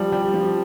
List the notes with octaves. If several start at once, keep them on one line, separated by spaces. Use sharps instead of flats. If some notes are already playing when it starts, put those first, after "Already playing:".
Already playing: F3 G3
G3
F3